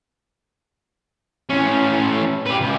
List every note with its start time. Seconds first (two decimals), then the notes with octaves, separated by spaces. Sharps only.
1.49 A2 C#4
2.46 G4 B4
2.60 C#2